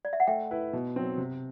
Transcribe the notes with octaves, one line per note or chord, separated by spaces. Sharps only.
D5
E5
F#5
A3 E5 G5
E4 B4
B2
F#3 C4
C3